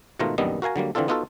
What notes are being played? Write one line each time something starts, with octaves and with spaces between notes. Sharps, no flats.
G#2 B2 D#3 A3 F4 A#5
A#1 F#2 D#3 G3 B3 D#5
F#4 A#4 F5 G#5 A#5
D3 F#3 G3 A#3
D3 E3 C4 D4 F4 A4
B3 D#4 F4 F#4 A4